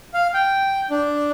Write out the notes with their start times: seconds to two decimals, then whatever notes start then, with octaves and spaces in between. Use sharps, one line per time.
0.14 F5
0.34 G5
0.90 D4